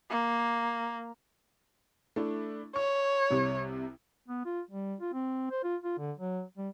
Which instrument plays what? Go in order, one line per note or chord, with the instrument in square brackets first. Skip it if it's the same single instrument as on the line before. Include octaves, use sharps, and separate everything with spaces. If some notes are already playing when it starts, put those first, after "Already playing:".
[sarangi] A#3
[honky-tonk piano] A3 D4 E4
[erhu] C#5 [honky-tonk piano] C#6
[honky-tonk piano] C2 C3 G3
[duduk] B3
F4
G3
F4
C4
C5
F4
F4
D3
F#3
G3